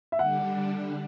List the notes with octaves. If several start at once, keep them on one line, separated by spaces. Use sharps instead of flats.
E5
D3 G3 D4 F#5